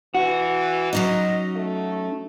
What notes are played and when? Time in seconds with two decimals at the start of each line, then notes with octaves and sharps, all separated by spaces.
0.15 E3 F#4
0.93 F#3 C#4 D#4 D#5
1.56 A3